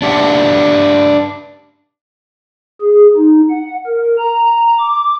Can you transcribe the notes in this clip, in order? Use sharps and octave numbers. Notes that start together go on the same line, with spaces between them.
D4 G4 E5 F#5
G#4
D#4
F#5
A#4
A#5
D6